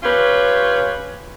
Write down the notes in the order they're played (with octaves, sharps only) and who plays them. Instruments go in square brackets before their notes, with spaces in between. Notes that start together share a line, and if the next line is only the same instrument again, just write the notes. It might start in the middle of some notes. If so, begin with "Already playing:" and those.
[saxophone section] C#4 F4 G4 B4 C#5